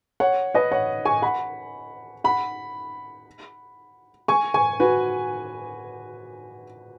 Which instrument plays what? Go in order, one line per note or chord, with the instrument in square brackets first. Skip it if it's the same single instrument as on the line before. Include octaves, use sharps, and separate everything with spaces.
[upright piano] C#5 F#5
B4 D#5
C#5 F#5
G#5 C#6
F#5 B5
F#5 B5
G#5 C#6
G#5 C#6
F#4 B4